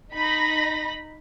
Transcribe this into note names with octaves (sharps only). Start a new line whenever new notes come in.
D#4 B5 A#6